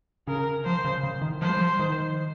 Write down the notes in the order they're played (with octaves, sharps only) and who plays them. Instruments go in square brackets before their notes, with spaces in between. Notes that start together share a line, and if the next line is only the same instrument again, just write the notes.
[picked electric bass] C#3 [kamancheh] A#4
[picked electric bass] F3 [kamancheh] C5
[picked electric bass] C#3
C#3
D#3
[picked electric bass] F3 [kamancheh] C5
[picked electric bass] G3
F3
D#3